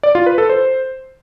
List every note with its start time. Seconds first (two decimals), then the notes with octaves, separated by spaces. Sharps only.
0.03 D5
0.15 F4
0.26 B4
0.38 A4
0.49 C5